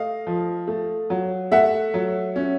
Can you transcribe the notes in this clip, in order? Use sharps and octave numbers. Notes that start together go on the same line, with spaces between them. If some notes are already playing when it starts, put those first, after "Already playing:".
Already playing: A3 D#5 F5
F3
A3
F#3
A3 E5 F#5
F#3
C#4